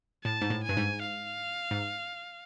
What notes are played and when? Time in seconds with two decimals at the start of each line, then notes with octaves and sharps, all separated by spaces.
0.24 A2 A5
0.41 G#2
0.50 A2
0.63 G#5
0.69 G2
0.77 G#2
1.02 F5
1.71 G#2